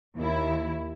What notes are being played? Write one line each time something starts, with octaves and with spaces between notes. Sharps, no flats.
D#2 E4